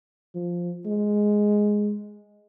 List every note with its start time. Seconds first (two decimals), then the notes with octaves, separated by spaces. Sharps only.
0.35 F3
0.86 G#3